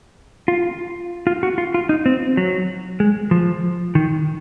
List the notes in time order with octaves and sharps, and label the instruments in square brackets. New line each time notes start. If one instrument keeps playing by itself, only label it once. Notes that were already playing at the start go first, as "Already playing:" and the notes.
[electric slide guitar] F4
F4
F#4
F4
F4
D#4
C4
F#3
G#3
F3
D#3